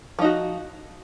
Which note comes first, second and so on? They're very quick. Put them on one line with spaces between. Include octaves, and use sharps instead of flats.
F3 D#4 F#4